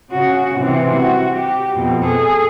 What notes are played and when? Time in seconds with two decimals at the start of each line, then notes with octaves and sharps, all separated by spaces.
0.11 C#3 F#4
0.60 C3 E3
0.95 F#4
1.36 G4
1.76 F2 B2
2.05 G#4 A4